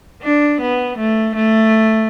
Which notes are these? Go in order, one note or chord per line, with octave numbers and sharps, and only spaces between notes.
D4
B3
A3
A3